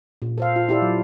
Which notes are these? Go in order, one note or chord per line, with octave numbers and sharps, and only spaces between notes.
A#2
A4 C5 F5
F4
E4 G4 A4 D5
F#3